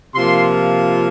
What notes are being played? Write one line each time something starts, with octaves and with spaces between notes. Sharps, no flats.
C3 F3 A#3 F4 C6